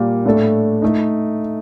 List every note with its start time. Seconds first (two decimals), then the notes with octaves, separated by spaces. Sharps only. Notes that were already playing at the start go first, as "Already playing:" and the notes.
Already playing: A#2 G3 A#3
0.26 A2 A3 D4 A4
0.82 A3 D#4